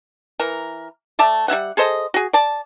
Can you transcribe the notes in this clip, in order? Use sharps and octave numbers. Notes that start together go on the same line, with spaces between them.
E3 A#4
A3 D5 E5 A5
G3 E4 E5 F#5
G#4 A4 C5 D#5
F#4 G#4
D5 A5